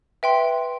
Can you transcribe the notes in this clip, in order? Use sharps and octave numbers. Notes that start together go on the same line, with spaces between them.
B4 E5 G5 C6